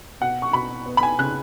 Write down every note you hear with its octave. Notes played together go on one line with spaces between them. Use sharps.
B2 F#5
C#6
B2 B5
B3
B5
G#5
C#3 F#6